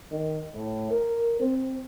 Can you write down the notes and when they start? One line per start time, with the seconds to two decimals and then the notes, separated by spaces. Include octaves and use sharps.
0.11 D#3
0.54 A2
0.91 A#4
1.40 C4